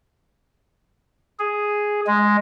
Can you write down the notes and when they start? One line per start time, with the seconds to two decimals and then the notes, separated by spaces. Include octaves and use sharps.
1.39 G#4
2.07 G#3